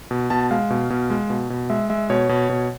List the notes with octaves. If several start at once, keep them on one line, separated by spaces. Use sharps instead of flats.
B2
B2 A5
G#3 F5
B2
B2
G#3
B2
B2
G#3 E5
G#3 E5
B2 C#5
B2
B2